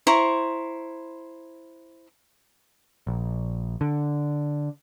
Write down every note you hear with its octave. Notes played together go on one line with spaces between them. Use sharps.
E4 C5 A#5 C#6
A#1
D3